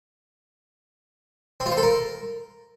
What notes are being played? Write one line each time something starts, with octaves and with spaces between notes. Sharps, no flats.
C4
F4
C5
A4
A#4